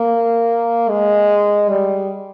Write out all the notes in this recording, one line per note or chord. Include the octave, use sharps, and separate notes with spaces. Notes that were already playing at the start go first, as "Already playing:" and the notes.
Already playing: A#3
G#3
G3